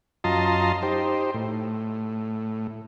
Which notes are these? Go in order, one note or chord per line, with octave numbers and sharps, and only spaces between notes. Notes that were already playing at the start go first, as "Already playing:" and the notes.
F#2 F4 D#5 A5 A#5 C6
D#4 G4 C5
A2